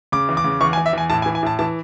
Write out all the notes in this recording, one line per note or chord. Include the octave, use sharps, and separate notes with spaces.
C#3 D6
E2
D6
C#3
E2 C#6
G#5
E2
E5
E2 G#5
A2 A5
G#5
E3
G#5
A2 A5
E3 A5